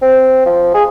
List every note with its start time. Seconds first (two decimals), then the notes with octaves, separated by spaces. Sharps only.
0.02 C4
0.46 F3
0.74 G#4